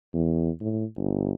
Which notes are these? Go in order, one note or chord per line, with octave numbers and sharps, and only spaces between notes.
E2
A2
G1